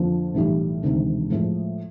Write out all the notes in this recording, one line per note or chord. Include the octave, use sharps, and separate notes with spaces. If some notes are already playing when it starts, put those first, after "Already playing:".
Already playing: F2 D3 F3 A#3
B1 A2 E3 G3
E1 D2 C3 D#3
A2 F3 G#3